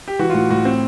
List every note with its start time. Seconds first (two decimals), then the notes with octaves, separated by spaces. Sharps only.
0.08 G4
0.19 E3 F#4
0.30 F4
0.34 A2 F#4
0.50 A2 F#4
0.65 C4